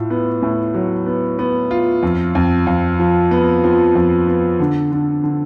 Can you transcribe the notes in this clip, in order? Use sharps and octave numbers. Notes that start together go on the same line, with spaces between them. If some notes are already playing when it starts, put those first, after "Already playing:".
Already playing: A2 F4
B3
A2
F#3
B3
B3
F4
F2
F2
F2
F3
B3
F3
F2
B3
D3
D3
D3